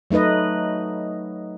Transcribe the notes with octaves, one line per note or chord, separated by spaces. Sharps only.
F#3 A3 D#4 B4 D#5